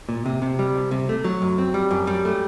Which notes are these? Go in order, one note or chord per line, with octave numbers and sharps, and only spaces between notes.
A#2
C3
C3
G3
C2
C3
A3
F#3
F#2
C4
G3
F#2
G3
A3